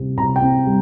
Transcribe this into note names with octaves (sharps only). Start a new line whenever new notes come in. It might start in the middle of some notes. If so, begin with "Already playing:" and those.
Already playing: C3 G3 C4
C3 A#5
G5
C4
G3